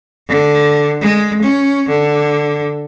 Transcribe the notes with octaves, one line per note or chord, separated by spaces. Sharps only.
D3
G#3
C#4
D3